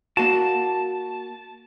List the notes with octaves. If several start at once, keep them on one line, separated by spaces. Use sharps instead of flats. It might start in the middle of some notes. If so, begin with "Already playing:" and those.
A#3 F#4 A5